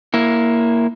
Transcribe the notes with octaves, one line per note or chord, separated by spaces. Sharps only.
A#3 E4